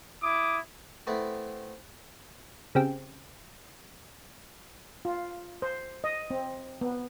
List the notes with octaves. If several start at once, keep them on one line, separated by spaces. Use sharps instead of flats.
E4 D6 D#6
A3 B3 C4 E4
C#3 C4 G4
F4
C5
D#5
C4
B3